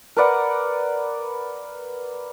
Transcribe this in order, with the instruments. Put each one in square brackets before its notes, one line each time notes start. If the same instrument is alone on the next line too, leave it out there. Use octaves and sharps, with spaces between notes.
[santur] A#4 B4 D5 F#5